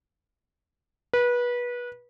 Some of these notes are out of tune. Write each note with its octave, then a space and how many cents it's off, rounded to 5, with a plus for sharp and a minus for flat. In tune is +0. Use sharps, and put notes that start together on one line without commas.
B4 -25